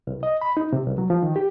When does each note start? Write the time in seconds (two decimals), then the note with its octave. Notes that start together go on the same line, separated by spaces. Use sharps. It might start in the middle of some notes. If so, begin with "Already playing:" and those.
0.07 C2
0.23 D#5
0.41 B5
0.57 D#4
0.73 C3
0.86 C2
0.98 F#3
1.10 F3
1.23 D#3
1.36 G4